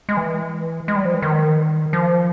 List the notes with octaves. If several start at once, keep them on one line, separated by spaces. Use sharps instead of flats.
G#3
E3
G#3
G3
F3
E3
D#3
F3